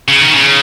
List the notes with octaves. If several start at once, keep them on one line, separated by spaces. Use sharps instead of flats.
C#3
D#3
C#3